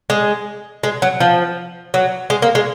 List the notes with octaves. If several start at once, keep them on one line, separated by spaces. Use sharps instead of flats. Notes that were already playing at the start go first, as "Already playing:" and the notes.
G#3
G#3
F#3
F3
F#3
G#3
A#3
G#3